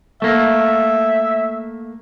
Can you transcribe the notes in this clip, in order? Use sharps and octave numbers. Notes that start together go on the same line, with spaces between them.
A3 A#3 E5